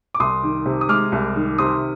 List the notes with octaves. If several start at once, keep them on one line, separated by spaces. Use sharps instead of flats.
D6
C2 C6 D#6
D#3
C3
D#6
G#3 D6 F6
C2
D#3
C3 C6 D#6